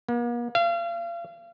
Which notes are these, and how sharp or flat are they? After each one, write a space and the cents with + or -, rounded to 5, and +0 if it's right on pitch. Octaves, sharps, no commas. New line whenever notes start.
A#3 +45
F5 -35